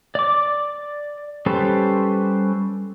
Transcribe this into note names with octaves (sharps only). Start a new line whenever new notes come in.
D5 D6
G3 C#4 A4 B4 C5